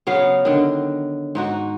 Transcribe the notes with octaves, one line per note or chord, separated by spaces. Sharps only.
C#3 F#3 B3 F5
D3 D#3
G#2 D#4 F#4